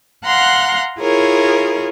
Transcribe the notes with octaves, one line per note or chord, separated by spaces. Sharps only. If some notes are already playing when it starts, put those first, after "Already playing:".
F5 F#5 A#5 C6 F#6
E4 F4 G#4 A#4 C#5